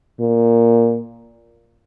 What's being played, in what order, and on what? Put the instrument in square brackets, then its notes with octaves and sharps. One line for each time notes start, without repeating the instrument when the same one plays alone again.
[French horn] A#2